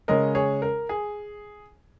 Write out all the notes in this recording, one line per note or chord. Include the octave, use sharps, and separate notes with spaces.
C#3 G#3 C#4 A#4 D#5
G#4 C#5
A#4
G#4